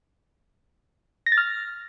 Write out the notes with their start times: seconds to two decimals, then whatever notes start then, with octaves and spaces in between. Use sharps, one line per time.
1.26 A#6
1.32 A6
1.38 F6